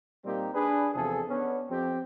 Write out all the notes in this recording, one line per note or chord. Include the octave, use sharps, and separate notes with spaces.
A#2 G3 A#3 C4 D#4 G4
D4 G#4 B4
E2 C3 F3 G#4 A4
B3 C#4 D4
F2 C4 G4